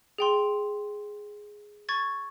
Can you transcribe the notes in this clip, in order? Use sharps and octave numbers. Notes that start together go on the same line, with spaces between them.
G#4 G5 C6
C#6 G#6 A6